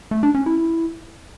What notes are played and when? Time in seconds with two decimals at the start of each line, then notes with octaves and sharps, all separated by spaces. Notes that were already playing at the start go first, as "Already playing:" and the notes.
0.11 A3
0.23 D4
0.35 C#4
0.46 E4